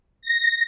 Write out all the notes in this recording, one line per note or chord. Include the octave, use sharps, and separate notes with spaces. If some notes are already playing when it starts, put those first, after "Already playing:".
A#6